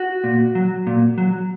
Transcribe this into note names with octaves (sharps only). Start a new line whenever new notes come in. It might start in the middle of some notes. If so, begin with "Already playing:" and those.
Already playing: F#4
A#2
F#3
A#2
F#3